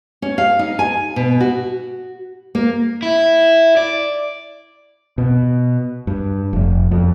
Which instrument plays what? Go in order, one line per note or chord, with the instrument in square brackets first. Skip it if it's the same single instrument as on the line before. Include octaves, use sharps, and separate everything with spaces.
[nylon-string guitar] C#4
F5
D#4
G#5
B2
F#4
A#3
[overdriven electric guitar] E4
D5
[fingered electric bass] B2
G2
F1
F2